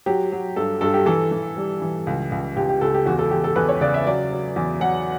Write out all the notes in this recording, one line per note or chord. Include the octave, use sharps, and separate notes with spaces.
F#3 G4
F#3
G2 A4
G2 A4
G4
E3 A4
E3
G3
E3
C#2
C#2
C#2 G4
G4
C#2 A4
G4
E2 F#4
A4
E2 G4
A4
E2 B4
C#5
C#3 D5
E5
F#3 D5
F#3
E2
F#3 F#5